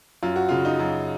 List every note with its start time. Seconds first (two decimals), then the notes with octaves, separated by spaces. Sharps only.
0.23 F#2 F4
0.36 F#4
0.49 C#3 F4
0.65 D#4
0.79 F#2